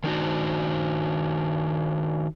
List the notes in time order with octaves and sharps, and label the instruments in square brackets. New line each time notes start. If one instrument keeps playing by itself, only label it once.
[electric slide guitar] D#3 D4 D#4 F#4